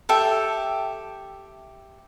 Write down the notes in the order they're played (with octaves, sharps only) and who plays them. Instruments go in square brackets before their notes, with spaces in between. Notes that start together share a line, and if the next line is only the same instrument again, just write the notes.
[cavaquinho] G4 A4 E5 G5